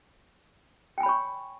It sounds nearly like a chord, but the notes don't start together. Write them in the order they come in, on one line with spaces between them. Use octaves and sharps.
G5 G#5 B5 C#5 C#6